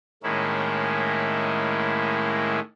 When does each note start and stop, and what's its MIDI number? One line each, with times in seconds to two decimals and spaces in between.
0.23 2.60 45
0.23 2.60 51
0.23 2.60 56
0.23 2.60 58
0.23 2.60 61
0.23 2.60 64